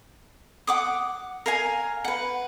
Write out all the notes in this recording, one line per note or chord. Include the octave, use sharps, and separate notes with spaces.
F#5 D6 D#6
A#4 F5 G#5
B4 F#5